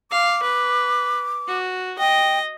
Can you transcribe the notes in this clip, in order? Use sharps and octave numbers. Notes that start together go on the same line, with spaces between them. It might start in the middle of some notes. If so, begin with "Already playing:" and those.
F5 D6
B4
F#4
D#5 G5